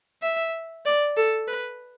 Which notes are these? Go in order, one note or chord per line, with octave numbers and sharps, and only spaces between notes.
E5
D5
A4
B4